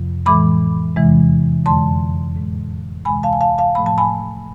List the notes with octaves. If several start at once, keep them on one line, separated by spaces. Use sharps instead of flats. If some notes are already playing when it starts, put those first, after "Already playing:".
Already playing: F2 C3 F3
A2 E3 G#3 B5 D6
E2 C3 E3 G#3
F2 D3 G#3 A5 C6
A2 G#3
D2 C3 E3 G#3 G#5 B5
F5 A5
G#5
F5 A5
F5 A5
A2 F3 A3 B5
A5
G#5 B5